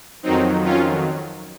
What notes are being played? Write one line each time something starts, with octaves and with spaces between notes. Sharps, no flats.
F2 D#3 F#3 C4 D#4
C#4 F4